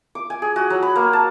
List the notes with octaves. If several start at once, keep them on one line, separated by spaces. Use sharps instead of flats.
D6
G#5
G#4
F#4
F#3
B5
A#3
A5